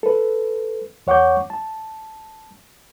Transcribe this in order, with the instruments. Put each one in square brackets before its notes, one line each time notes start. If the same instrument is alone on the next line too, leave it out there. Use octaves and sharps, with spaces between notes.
[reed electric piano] A4 B4
E2 C#5 F#5 C#6 D6 G6
A5